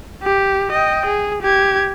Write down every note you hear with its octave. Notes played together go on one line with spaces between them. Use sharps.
G4
D#5 G5
G#4
G4 G#6